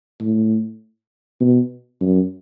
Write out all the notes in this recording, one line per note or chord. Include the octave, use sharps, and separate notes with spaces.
A2
B2
F#2